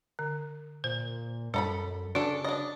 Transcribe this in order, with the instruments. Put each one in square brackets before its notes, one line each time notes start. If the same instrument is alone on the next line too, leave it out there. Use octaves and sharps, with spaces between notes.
[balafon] D3
[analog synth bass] A#2 [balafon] C5
[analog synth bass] F#2 [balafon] G3 [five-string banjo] A4 A#5 B5
[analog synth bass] C#3 [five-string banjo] D4 A4 [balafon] F#4
[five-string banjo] D4 D#5 [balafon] C#5